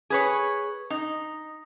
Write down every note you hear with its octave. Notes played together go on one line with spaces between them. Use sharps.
G#4 B4 C#5
D#4